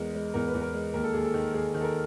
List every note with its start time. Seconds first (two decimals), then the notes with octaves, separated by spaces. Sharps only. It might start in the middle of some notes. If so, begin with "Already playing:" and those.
Already playing: E2 G#3 A#4
0.15 G#3
0.34 E2 A#4
0.48 B4
0.54 E2
0.62 A#4
0.74 G#3
0.94 D#2 A#4
1.04 A4
1.13 D#2 G#4
1.24 A4
1.34 D#3
1.54 D#2 G#4
1.74 D#3
1.80 A4
1.84 A#4